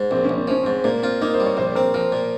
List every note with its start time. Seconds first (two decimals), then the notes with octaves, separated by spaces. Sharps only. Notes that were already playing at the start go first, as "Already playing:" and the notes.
Already playing: G#2
0.11 A#1 C4
0.24 C#4
0.30 A#1
0.37 C4
0.48 F3 C#4
0.63 G#2 C4
0.84 A#2 A#3
1.02 C4 F4
1.21 A#3 D#4
1.34 C5
1.40 G3
1.46 C#5
1.57 A#1 C5
1.67 C5
1.75 C4 A#4
1.94 F3 A#4
2.12 A#2